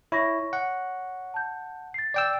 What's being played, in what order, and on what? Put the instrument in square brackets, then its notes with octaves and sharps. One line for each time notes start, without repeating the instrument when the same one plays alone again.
[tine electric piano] E4 [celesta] C#5 C#6 A#6
[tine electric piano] F#5
[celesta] A5 G6
A6 C7
[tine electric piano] D5 G5 E6